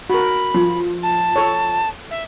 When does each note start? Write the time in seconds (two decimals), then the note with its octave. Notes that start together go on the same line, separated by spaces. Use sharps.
0.10 F#4 A#4 B5
0.54 F3
1.03 A5
1.36 A4 C#5
2.11 E5